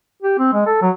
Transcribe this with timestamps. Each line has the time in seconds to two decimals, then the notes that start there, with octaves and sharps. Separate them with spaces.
0.22 G4
0.39 C4
0.53 G#3
0.66 A4
0.82 F#3